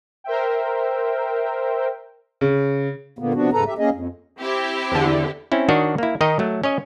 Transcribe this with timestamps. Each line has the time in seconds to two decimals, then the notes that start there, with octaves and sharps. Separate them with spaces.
0.24 A#4 C5 E5 G5
2.41 C#3
3.19 A#2 D3 A#3 B3
3.34 C3 F3 B3 D4 F#4
3.53 E2 G#2 C#3 A4 B4 A#5
3.67 G4 E5
3.78 A#3 C#4 G#4 D#5
3.92 F2
4.41 C4 E4 G4
4.92 E2 D3
5.52 C4 C#4 E4
5.69 D#3 D4 F#4 C#5 D#5
5.98 A#3 E4
6.21 D#3 D#4 D#5 G5 A#5
6.39 F#3 A3
6.64 C#4 C#5 D#5